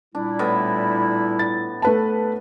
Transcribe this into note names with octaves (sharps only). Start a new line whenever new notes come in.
A#2 G3 D4 E4
A2 B3 E5
A6
A3 B4 A5